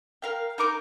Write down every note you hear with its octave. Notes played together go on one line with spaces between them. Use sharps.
A#4 F5 G5
D#4 A#4 D6 G6